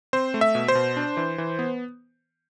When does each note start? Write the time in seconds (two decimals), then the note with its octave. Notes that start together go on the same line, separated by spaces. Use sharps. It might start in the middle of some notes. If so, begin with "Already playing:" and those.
0.13 C4 C5
0.34 A3
0.41 E5
0.55 B2
0.68 C5
0.75 B2
0.97 D4
1.17 E3
1.38 E3
1.59 B3